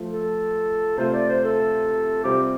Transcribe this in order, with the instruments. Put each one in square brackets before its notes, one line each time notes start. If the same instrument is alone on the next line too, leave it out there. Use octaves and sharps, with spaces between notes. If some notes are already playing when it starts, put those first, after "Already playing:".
Already playing: [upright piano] F3 A3 F4
[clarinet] A4
[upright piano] C3 A3 F4 [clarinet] C5
[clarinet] D5
C5
A4
[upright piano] C3 G3 C4 F4 [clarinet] G4